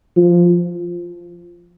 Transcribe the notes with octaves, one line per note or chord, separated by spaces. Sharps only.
F3